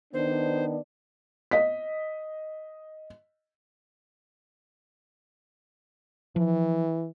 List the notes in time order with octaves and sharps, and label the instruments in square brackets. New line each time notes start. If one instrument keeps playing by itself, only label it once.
[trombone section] D#3 B3 D4 [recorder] C5
[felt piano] D#5 B6
[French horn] E3 [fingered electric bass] F3